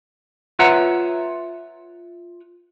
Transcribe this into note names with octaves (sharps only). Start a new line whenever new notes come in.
F4 B4 C#5 E5 F#5 A#5